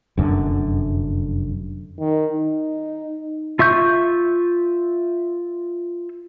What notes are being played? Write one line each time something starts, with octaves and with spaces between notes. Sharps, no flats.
F1 F#2 A2 D3
D#3
D#4
F4 E5 C#6 G6